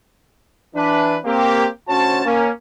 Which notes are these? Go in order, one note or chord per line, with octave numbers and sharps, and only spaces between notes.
E3 D4 B4
A#3 C4 G4
D2 C#4 F#4 C5 C#5 A5
A#3 C#4